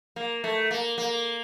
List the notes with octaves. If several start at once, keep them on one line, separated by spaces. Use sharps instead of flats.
A#3
A3
A#3
A#3